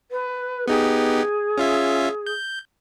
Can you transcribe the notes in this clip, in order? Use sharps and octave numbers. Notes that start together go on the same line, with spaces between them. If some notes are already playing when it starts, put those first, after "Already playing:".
B4
B3 D#4 G4 G#4
C#4 F4 E5
G6